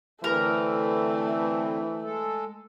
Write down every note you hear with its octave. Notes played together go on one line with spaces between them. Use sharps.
D3 E3 A3 C4 A#4
G#3 A4